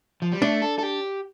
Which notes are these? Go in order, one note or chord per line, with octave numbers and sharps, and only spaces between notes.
F3
G3
A3 D4
A4
A4
G4